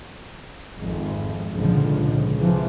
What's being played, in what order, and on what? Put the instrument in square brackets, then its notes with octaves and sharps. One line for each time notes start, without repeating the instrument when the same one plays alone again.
[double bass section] G#1 F2
G#1 C#2 A#2 D3 F3
C#2
C3 E3 F3